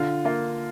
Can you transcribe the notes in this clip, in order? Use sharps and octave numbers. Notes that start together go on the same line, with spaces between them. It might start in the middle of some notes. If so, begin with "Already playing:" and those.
Already playing: D3 F4
A#3 F4